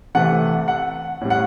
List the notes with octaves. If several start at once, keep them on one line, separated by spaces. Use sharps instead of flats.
C3 E3 A3 F#5
F#5
A2 G3
F#5